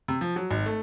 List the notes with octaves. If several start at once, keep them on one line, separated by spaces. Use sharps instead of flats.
C3
F3
F#3
G#1
A3